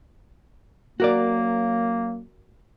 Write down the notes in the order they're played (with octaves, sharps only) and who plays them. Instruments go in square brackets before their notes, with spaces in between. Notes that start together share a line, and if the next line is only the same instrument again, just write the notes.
[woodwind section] F#2 F#3 A#3 [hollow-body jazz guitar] F#4 A#4 D5